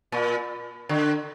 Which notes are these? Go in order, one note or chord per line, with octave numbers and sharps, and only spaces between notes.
A#2
D3